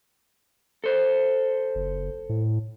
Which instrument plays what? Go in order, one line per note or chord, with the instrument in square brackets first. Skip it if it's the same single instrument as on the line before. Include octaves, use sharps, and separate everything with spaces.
[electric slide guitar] A4 C5
[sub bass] F#1
A2